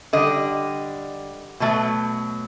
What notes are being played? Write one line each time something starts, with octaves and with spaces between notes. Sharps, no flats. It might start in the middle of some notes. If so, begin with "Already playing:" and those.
D3 G3 D#5
B2 F#3 A3